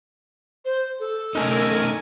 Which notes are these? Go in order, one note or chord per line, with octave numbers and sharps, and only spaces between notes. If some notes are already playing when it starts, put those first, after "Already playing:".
C5
A4
A3 C#4 D#4 A#4 G#5